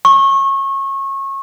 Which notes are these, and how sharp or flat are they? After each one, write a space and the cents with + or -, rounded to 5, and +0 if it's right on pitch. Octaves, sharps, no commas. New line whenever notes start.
C#6 -25